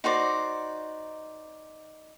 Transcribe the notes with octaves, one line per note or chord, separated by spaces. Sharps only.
D#4 F#4 C5 D5